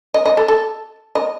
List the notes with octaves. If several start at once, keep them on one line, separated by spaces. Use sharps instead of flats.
D#5
D#5
A4
A4
D#5